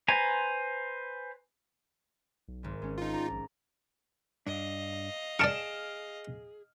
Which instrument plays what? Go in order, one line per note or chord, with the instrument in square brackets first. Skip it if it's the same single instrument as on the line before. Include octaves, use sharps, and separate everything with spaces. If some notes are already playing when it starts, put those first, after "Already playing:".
[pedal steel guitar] B4 C5 G#5 A#5
[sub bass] B1
[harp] G#1 G#2
[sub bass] G#1 [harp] G#3 C#4
[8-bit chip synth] D#4 F4
[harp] D5 A#5
[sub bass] A#1
[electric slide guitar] G2 D4 [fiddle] D#5 F5
[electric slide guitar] G#4 [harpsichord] D5 A5 C#6 [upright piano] F6 D7 E7